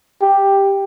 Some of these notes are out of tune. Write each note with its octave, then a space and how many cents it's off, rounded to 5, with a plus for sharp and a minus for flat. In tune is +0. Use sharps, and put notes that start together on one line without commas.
G4 +5